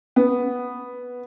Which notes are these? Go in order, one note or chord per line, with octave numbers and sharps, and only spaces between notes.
B3